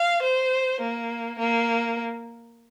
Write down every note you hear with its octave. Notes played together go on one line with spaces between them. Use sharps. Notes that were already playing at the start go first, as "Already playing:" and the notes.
Already playing: F5
C5
A#3
A#3